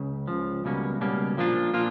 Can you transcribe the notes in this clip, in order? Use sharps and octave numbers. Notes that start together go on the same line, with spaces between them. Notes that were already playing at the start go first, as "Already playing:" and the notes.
Already playing: C#2 C#3
C#2 C#3 F3
C#2 B2 G3 A#3 C#4
C#2 B2 G3 A#3 C#4
A#2 F3 A#3 D4 F4
A#2 F3 A#3 D4 F4